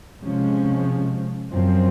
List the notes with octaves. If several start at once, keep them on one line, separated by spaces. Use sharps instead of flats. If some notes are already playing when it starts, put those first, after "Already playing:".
C3 F3 G#3 C#4
F#2 F3 C4